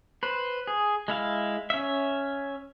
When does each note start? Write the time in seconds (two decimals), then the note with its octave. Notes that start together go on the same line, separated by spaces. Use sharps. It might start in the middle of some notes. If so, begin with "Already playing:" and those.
0.23 B4 C5
0.67 G#4
1.08 G#3 E4 F5
1.70 C#4 E5